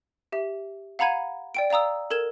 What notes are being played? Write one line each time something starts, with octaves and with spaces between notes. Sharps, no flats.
G4 E5
F5 F#5 A#5 B5 G#6 D#7
D5 G5 D7
D5 F5 A#5 D#6 E6
A4 A#4 G#6 E7